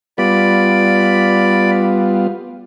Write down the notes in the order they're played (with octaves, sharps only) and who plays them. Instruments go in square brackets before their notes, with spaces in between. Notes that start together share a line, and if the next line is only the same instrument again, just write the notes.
[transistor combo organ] G3 B3 F4 [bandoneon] D5 B5